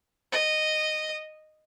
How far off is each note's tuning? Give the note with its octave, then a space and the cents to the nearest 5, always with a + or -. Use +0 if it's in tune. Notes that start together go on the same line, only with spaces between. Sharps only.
D#5 -10